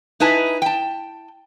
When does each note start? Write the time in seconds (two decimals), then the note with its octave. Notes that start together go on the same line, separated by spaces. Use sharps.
0.20 D#4 E4 B4 G#5 A5
0.62 G5 A5